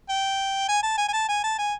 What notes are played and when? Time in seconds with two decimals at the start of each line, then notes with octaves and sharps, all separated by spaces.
0.09 G5
0.69 G#5
0.83 A5
0.98 G#5
1.08 G#5
1.13 A5
1.29 G#5
1.44 A5
1.59 G#5